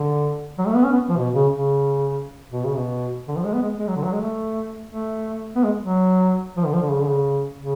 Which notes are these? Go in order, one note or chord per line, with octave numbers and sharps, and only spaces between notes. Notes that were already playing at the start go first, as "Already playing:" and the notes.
Already playing: D3
F#3
A3
B3
C#4
B3
F3
B2
C#3
C#3
B2
C#3
B2
D3
F3
G#3
B3
G#3
G#3
F#3
D3
F#3
G#3
A3
A3
B3
G#3
F#3
F3
D3
F3
D3
C#3
D3
C#3
C#3